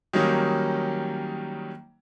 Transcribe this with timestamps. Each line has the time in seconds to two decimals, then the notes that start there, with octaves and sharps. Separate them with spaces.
0.13 D#3 F#3 G3 A#3 C#4 D#4